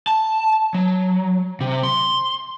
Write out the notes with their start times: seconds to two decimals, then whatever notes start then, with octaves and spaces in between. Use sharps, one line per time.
0.07 A5
0.74 F#3
1.61 C3
1.83 C6